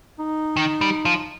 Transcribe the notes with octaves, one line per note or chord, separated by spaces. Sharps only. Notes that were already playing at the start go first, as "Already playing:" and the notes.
D#4
D#3
G3
F3